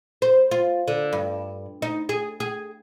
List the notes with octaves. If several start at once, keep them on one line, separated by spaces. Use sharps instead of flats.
C5
F4
D3
G2
D#4
G#4
G#4